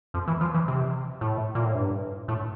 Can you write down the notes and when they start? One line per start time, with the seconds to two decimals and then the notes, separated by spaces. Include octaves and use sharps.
0.14 F2
0.28 E3
0.41 F3
0.54 E3
0.68 C3
1.21 A2
1.55 A#2
1.65 A2
1.75 G2
2.28 A2